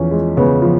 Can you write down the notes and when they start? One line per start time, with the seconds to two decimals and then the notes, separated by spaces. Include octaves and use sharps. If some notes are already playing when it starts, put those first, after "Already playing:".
Already playing: E2 F3 C#4
0.11 G#3
0.37 C#3 B3
0.62 F3